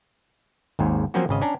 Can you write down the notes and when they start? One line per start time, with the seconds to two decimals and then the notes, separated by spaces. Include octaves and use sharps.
0.79 G#1 D#2 G#2
1.14 F3 F#3 A#3 C4 C#4 F#4
1.29 G#1 C#3 D#5
1.41 C#4 D4 A#5